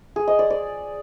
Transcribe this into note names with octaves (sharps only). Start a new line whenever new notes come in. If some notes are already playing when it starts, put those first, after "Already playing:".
G#4
D#5
D5
D5